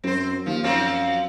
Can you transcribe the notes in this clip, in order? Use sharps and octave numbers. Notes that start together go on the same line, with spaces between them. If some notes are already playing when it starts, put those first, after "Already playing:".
F#2 C4 C5
D#2 F3
F#2 F3 F#3 C4